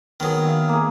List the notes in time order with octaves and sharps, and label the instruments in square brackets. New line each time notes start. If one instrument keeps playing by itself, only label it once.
[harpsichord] D#3 F#3 [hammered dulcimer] B3 G#4
[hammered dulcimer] E5 F5
A#3 G#4